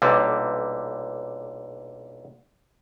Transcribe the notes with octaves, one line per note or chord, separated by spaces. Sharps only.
B1 A#2 D3 G3